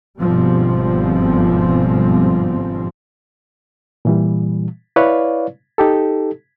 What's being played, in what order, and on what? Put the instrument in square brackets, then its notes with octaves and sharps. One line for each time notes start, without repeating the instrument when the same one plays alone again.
[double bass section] G1 G#2 B2 F3 G3 C4
[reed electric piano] A#2 E3 G3
E4 B4 C#5 D5 F5
D#4 G4 A4